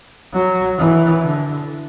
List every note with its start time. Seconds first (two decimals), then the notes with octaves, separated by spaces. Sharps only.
0.33 F#3
0.78 E3
1.21 D3